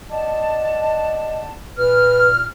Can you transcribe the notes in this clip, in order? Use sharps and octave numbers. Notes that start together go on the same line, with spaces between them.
D5 D#5 F#5 A5
A#2 B4 F6